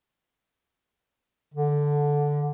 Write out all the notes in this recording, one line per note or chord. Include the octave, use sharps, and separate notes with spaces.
D3